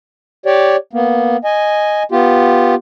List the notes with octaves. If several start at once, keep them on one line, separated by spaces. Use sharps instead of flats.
G4 C#5 D5
A#3 B3
D#5 G#5
B3 F4 G4